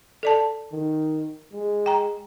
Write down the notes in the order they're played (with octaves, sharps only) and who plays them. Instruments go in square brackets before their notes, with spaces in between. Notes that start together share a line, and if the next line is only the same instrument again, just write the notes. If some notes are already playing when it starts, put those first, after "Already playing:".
[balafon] A4 D5 A5
[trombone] D#3
G#3
[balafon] G5 A#5